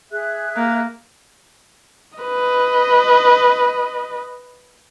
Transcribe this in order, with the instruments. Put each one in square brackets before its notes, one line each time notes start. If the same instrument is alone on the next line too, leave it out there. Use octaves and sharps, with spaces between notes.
[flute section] G#4 E5 F#6
[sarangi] A#3
[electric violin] B4 D#5